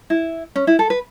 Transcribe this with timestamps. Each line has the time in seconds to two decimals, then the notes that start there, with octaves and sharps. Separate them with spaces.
0.10 E4
0.56 C#4
0.67 E4
0.79 A4
0.90 B4